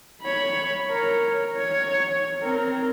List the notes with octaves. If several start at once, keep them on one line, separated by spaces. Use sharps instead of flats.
C#5 B5
A#4 C#5
C#5
C4 A#4